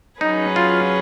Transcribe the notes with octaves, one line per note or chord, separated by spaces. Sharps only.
F#3 C#4 D#4 G#4 B4
F4